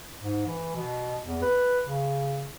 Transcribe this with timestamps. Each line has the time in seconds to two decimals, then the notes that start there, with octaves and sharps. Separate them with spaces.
0.19 G#2
0.46 E3
0.76 B2
1.25 E2
1.42 B4
1.84 C#3